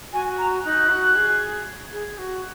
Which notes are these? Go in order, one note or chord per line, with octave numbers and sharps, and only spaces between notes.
F#4 G#5
A#5
D#4 F#6
F#4
G#4
G#4
F#4